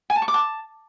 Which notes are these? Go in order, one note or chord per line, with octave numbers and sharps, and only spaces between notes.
G#5
A5
C#6
D6
A5